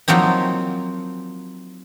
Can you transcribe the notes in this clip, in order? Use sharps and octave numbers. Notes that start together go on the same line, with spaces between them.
F3 F#3 A#3 C4 D#4